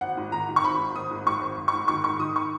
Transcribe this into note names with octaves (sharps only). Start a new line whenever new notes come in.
G#1 F#5
G#2
D#3 A#5
D#3
C#6
G#1 B5
G#2
G#1 D#6
G#2
G#2 C#6
G#1
G#1
C#6
G#2
D#3 C#6
G#2 C#6
D#3 D#6
C#6